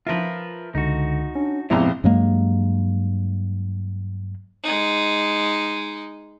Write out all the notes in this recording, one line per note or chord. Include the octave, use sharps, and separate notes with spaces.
F3 F4 A#4 B4 E5
C#2 D3 D#4 F#4
C#4 D4
A#1 F2 G#2 C3 F3 B3 E4 A#5
G2 F#3 G#3 A#3
G#3 D#4